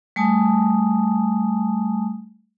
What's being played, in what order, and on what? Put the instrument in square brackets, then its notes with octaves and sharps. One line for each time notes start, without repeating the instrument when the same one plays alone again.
[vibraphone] G3 A3 G#5 A5 D#6